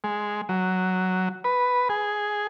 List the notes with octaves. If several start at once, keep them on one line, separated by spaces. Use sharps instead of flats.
G#3
F#3
B4
G#4